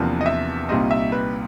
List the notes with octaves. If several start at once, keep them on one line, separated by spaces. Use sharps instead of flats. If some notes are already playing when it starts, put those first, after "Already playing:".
Already playing: E2 C3 F3 A#3 D4 B4
D#5
E5
C2 A#2 G3 C4 D#4 D#5
E5
B4